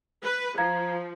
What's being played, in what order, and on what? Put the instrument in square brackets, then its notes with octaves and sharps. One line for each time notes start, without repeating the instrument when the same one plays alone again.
[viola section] B4
[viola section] F3 [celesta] F5 A#5 G#6